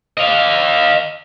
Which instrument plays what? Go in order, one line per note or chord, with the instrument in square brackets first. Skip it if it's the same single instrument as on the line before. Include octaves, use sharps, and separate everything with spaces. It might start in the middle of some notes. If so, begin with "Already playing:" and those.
[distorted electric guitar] D#5 F5